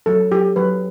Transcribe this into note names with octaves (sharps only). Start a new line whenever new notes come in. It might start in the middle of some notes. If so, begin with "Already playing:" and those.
F#3 A4
F#3 G4
F#3 B4